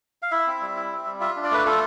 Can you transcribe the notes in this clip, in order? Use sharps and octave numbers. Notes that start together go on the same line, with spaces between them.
F5
E4 E5
C4
G3
E4
C4
G3
F4 E5
D4
D5
A3 B4
F4 A4